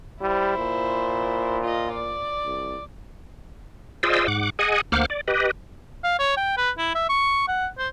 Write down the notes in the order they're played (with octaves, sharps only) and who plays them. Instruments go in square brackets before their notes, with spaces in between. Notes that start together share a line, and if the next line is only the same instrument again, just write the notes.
[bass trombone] G3 [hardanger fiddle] E4 C5
[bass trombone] A#2
[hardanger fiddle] F4 D#5
D5
[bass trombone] C2
[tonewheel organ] F4 G#4 C5 D5 D#5 E6
G#2 F#5 D6
G#4 D#5 F#5 G#5
D2 A#3 C5 F#5 D6 F6
D5
G4 B4 D#5
[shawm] F5
C#5
G5
B4
E4
E5
C#6
F#5
C5